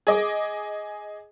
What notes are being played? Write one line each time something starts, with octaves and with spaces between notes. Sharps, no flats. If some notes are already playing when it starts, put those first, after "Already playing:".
G#4 D#5 D6